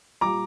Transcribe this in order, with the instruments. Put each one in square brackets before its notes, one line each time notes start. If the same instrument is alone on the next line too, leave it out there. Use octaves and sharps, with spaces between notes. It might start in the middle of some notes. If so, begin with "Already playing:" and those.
[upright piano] A#2 G3 A#5 D6